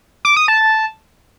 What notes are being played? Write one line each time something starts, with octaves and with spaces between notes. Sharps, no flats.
D6
D#6
A5